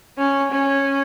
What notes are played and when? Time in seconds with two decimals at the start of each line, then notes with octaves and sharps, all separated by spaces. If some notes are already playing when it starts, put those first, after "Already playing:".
0.18 C#4
0.51 C#4